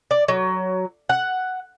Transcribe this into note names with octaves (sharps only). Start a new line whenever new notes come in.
D5
F#3
F#5